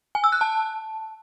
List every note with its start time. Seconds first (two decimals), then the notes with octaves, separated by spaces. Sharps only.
0.15 G#5
0.24 E6
0.32 F#6
0.41 A5